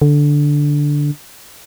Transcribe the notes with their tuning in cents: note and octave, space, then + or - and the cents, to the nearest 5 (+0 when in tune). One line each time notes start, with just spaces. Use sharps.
D3 -5